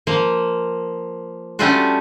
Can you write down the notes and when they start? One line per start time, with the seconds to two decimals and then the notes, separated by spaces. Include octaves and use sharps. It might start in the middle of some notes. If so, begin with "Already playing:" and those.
0.07 F3 A#3
1.59 G3 A3 C#4 D4 F4 F#4